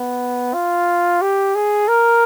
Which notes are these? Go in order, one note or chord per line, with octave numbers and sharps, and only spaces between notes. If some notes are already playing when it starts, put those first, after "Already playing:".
Already playing: B3
F4
G4
G#4
A#4